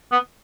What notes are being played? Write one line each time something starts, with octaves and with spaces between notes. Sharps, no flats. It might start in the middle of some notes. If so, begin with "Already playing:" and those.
B3